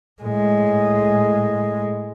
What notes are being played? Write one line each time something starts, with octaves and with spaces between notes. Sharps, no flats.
A2 G#3